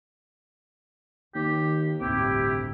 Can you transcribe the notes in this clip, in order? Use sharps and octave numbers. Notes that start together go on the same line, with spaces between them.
D#2 D#3 G4
G1 D2 A2 C3 E4 G4